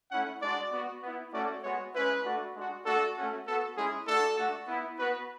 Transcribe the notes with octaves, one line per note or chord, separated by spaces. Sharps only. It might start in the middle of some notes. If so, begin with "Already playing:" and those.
A3 C#4 E4 F#5
G#3 D4 F#4 D5
B3 F#4
B3 E4
A3 C#4 F#4 D5
G#3 B3 F#4 C#5
G#3 C#4 E4 B4
A3 D4 F#4
G#3 D4 F#4
A3 D4 F#4 A4
A3 C#4 F#4
B3 F#4 A4
G#3 C#4 E4 G#4
A3 D4 F#4 A4
A3 D4 F#4
B3 E4
B3 F#4 B4